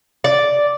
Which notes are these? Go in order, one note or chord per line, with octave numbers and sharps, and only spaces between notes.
D5